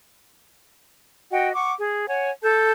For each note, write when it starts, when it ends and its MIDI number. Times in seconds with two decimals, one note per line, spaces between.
1.31 1.51 66
1.31 1.51 75
1.31 1.51 78
1.31 1.51 79
1.54 1.72 78
1.54 1.72 85
1.54 1.72 86
1.76 2.06 68
2.08 2.30 73
2.08 2.30 78
2.08 2.30 80
2.42 2.72 69
2.42 2.72 81
2.42 2.72 91